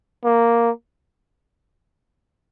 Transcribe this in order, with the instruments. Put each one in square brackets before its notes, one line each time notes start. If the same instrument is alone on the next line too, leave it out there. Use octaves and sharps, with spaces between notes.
[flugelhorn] A#3